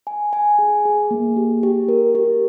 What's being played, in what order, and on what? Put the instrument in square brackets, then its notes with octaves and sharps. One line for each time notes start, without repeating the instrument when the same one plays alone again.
[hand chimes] G#5
G#5
G#4
G#4
A#3
G4
G4
A#4
G4